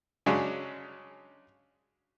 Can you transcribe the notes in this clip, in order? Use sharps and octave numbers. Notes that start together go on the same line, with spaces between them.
C#3 F#3 G#3 C#4 D4